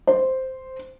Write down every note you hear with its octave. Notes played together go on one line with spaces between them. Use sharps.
C5